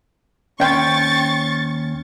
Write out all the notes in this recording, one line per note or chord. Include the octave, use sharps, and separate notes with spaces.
D#2 C4 C#4 G5 C6 C#6 A6